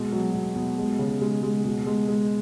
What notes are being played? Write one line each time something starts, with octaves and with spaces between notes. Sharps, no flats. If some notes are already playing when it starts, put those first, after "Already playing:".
Already playing: B2 G#3
F#3
B2
B2
G#3
C#3
G#3
G#3
B2
G#3
G#3